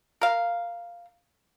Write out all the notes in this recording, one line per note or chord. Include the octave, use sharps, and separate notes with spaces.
A#4 F5